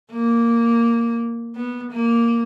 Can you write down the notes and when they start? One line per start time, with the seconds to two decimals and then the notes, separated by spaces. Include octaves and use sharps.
0.12 A#3
1.56 B3
1.91 A#3